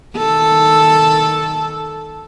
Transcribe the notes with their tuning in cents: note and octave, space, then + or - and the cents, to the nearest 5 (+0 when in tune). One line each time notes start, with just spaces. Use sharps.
D#3 +0 A4 +0